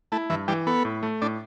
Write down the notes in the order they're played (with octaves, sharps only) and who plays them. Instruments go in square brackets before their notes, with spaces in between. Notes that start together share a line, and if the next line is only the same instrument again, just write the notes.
[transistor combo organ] A3 [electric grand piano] E4
[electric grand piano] G2 [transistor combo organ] E3
[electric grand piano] E3 [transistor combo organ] G3
[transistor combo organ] B3 [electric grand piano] A4
[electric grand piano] A2
A3
[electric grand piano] A2 [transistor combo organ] D4